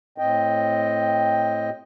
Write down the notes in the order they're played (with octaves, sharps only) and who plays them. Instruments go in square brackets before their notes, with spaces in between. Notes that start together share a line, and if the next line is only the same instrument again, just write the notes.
[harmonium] A2 C4 D#5 G5